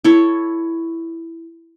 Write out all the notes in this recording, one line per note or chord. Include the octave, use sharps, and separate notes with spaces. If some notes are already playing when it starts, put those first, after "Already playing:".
E4 A4 C#5